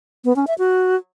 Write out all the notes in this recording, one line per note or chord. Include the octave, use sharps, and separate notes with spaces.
B3
C#4
E5
F#4